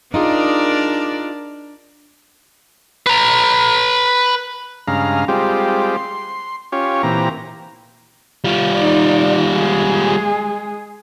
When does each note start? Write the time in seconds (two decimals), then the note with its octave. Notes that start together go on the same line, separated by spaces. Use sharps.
0.14 D4 D#4 F4 G#4 A#4 D5
3.07 B4 A#5
4.87 G2 C#3 G#3 F5 A#5
5.28 G3 G#3 C4 F4 G4
5.97 C6
6.72 C#4 F4 G4 C#5
7.03 A#2 E3 C4 G4 A#5
8.44 G3 F4
8.75 D#4 D5
9.53 G#3 G#4